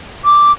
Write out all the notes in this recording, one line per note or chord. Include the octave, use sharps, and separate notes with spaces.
D6